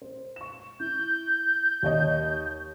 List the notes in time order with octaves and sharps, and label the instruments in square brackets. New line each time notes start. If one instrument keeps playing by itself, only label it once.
[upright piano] C5
C#6 E7
[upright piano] E4 [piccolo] G6
[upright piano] D#2 C#5 D#5